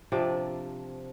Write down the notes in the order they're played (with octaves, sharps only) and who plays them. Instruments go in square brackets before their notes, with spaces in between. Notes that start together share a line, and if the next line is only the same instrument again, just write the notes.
[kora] C3 F3 D4 D5